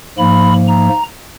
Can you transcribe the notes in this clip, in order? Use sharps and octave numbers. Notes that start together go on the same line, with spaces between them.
G#2 F3 A#3 B5
A#5